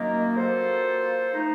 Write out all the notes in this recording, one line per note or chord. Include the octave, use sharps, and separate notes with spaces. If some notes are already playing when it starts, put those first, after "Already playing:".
Already playing: F#2 D#3 F#3 A#3 D#4
F#3 A#3 F4 A4 C5
F3 A3 D#4